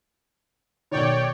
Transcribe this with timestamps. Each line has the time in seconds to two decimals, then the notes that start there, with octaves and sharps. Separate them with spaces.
0.91 B1 D#3 C#5 D5 G5